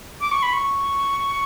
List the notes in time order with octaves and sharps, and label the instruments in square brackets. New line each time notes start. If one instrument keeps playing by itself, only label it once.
[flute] D6
C#6
B5
C#6